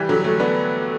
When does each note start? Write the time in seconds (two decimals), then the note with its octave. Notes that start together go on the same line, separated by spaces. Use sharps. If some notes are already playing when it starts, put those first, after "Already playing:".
Already playing: E3 G3
0.09 D3 F#3
0.24 F#3 A3
0.40 B3 D4